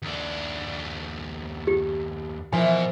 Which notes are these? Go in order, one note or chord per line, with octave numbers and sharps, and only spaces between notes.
D#2 D4
G4
B2 E3 F3 A#4 G#5